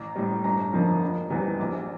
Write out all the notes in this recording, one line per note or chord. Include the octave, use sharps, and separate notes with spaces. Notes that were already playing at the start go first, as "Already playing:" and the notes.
Already playing: A1 A#5
A2 G3
G1 A#5
F2 D3 F3 A#3
E1
E2 E3 G3
A#1